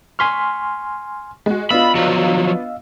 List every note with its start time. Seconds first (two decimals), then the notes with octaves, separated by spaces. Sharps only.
0.19 G#5 C6 C#6 F6 B6
1.46 G#3 F#4
1.71 B3 D4 F4 D#5 F5 B5 E6
1.95 F3 F#3